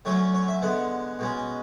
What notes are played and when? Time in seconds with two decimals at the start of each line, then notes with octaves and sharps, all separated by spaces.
0.05 D3 F#3 A3 C#4 C#5
0.34 C#5
0.48 E5
0.62 D3 G#3 B3 F#5
1.19 B2 G#3 C#4